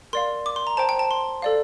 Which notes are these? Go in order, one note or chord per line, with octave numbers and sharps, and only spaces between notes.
A#4 D5 F5 C6
D6
C6
A#5
C5 G5 A5
G5
A5
C6
A4 D5 F5